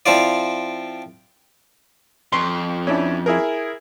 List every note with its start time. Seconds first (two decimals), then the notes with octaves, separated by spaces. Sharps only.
0.06 F3 C4 E4 F4 D5
2.32 F2 C6 C#6
2.87 C#4 D4 E4
3.26 E4 G#4 A#4